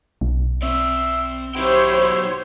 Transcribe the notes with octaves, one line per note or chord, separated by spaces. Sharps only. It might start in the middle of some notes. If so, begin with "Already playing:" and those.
B1
C4 D5 E5
F#3 D#4 E4 G4 C5 C#5 G5